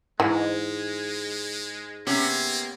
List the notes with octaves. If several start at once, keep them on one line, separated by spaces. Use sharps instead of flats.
G#2 E3 G#3
C3 A#3 B3 C#4